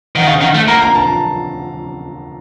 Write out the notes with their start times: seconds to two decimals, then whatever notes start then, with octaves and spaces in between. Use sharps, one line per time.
0.16 D#3 F#5
0.27 C#3 F5
0.41 D#3 F#5
0.54 A3 F#5
0.68 A#3 A#5
0.82 A#5
0.95 A5